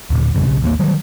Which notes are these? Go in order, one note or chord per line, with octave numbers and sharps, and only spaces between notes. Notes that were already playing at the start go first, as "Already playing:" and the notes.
D#2 A#2 D3
A1 F2 C#3 G3
B1 C#3
A1 D#2 A3 A#3
D#3 F#3 G3